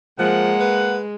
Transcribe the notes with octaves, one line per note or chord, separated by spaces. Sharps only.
F3 G#3 A#3 F#5
B4